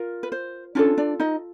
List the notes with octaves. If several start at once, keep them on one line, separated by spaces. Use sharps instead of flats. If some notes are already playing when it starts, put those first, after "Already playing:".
Already playing: F4 A#4
B4
C5
C#4 D4 F4 A4 C#5
D4 D5
D#4 D#5